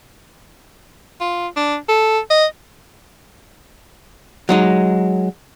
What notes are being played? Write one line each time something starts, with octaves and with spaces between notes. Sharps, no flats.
F4
D4
A4
D#5
F#3 G#3 D#4